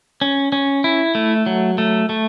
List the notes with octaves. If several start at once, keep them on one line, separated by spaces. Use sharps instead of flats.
C#4
C#4
E4
A3
F#3
A3
A3